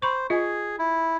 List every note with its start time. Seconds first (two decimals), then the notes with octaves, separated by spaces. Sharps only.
0.02 C5 B5 C#6
0.30 F4 G#4 D#5
0.79 E4